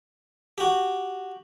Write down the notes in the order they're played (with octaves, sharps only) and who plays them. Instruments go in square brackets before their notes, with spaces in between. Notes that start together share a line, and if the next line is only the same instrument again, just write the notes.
[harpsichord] F#4 G4